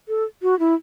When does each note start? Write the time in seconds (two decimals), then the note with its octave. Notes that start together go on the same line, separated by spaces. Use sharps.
0.08 A4
0.42 F#4
0.59 E4